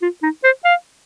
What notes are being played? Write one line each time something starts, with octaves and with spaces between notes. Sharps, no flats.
F4
D#4
C5
F5